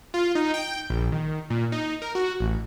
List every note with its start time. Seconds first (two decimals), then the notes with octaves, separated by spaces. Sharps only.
0.14 F4
0.35 D#4
0.54 G5
0.90 A#1
1.12 D#3
1.50 A#2
1.72 D#4
2.02 A#4
2.15 F#4
2.40 A1